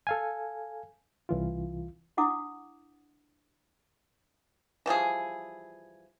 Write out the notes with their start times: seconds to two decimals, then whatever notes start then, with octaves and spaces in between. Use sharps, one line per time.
0.07 A4 F5 G#5
1.29 C2 E3 F4
2.17 D4 E4 F#5 D6 D#6
4.86 E3 F3 G3 G#4